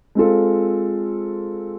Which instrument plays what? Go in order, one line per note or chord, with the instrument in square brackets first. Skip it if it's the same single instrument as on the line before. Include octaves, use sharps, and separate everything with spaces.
[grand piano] G#3 C4 F4 A4